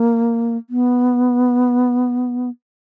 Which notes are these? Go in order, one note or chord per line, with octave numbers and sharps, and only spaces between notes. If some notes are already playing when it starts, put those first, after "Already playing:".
Already playing: A#3
B3